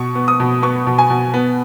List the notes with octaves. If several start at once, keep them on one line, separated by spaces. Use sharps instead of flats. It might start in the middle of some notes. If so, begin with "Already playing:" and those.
Already playing: B2 C#6
B3
D#6
B2
B3 C#6
B2
G#5
B2
B3